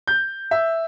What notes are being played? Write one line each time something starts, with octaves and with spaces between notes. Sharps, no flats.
G6
E5